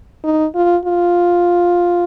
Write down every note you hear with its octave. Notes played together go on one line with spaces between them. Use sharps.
D#4
F4
F4